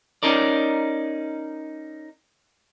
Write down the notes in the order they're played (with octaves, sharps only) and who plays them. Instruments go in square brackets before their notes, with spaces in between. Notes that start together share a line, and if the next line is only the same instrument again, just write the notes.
[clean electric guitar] C#4 D#4 A#4 D5